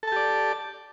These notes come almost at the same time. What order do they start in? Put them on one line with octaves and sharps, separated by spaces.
A4 A5 G4 D5